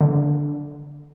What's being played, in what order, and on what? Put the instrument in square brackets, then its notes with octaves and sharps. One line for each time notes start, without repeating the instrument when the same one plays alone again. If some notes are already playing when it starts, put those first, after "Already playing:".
[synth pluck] D3